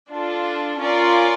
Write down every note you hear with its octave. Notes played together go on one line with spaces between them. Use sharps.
D4 F4 A4
C#4 F4 A#4 D5